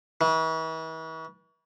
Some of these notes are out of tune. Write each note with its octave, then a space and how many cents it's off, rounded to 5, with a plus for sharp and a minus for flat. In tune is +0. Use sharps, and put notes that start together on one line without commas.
E3 -40